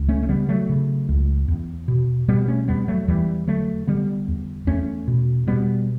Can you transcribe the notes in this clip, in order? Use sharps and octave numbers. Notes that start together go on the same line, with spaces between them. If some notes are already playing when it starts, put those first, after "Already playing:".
Already playing: C#2
A3 C#4
A3
C#3 G3 B3
F#3 A3
C#3
C#2
E2
B2
B2 G3 B3
A3 C#4
E2 G3 B3
F#3 A3
E2 E3 G3
D3 F#3 A3
D3 G3 B3
E2
E2 A3 C#4
B2
B2 G3 B3